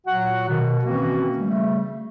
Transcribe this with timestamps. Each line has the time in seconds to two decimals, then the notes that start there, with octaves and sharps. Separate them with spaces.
0.07 A#2 F#3 F#4 F#5
0.49 B2 D#3
0.85 D#3 E3 A#3 C4 C#4 F#4
1.38 C#3 G3 A3